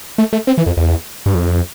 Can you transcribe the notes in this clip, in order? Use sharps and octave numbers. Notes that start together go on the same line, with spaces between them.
A3
A3
C4
E3
F2
E2
G2
F2